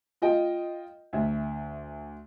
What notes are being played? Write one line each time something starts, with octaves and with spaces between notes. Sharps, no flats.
F4 D#5 G5
D2 E5